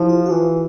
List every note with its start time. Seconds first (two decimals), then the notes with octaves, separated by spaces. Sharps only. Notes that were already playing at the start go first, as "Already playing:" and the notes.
Already playing: F3 E4 G4
0.09 F4
0.26 F#4
0.30 E3 F4